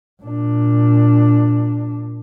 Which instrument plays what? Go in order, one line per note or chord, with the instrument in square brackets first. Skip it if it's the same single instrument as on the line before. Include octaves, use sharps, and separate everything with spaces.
[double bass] A#2 D4